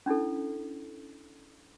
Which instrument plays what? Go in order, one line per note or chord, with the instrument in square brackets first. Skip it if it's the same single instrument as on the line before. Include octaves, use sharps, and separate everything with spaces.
[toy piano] C#4 D4 E4 A4